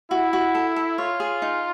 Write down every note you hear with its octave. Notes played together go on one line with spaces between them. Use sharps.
E4 F#4
F#4
A4
A4
F4 C#5
G#4
D#4